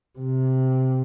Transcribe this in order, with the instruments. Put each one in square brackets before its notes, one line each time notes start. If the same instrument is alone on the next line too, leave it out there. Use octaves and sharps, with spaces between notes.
[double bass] C3